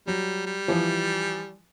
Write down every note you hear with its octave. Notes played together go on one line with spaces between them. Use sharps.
F#3 G3
G3
E3 F3